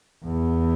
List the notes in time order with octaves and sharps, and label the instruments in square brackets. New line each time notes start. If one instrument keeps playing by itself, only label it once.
[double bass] E2